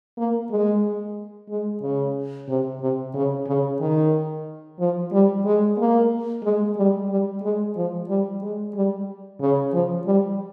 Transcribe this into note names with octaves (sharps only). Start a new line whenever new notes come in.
A#3
G#3
G#3
C#3
C3
C3
C#3
C#3
D#3
F3
G3
G#3
A#3
G#3
G3
G3
G#3
F3
G3
G#3
G3
C#3
F3
G3